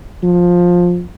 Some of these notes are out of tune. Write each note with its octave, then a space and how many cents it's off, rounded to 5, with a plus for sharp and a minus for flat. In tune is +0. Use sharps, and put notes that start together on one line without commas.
F3 +15